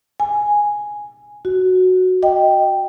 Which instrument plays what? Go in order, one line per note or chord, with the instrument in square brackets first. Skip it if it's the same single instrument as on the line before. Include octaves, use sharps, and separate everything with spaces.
[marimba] G#5
F#4
D#5 G5